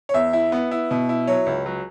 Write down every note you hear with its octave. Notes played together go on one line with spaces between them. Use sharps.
C#5
E2 E5
E4
B3
E4
B2
E4
F#3 C#5
C#2
F#3